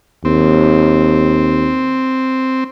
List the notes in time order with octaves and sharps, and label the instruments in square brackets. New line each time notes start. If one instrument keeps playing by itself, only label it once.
[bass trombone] D#2 [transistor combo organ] C4